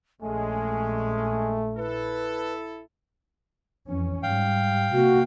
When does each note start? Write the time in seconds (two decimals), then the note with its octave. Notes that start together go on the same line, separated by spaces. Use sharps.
0.22 A#1 G#3 A3 C#4 G#5
1.77 E4 A4 B4
3.88 F2 E3 C#4
4.23 G#2 G3 F5 G5
4.93 C3 A#3 F#4